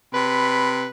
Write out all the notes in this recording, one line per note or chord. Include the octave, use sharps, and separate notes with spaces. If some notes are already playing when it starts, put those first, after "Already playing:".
C3 B4 B5